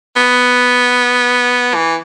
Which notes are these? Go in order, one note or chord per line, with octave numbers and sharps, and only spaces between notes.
B3
E3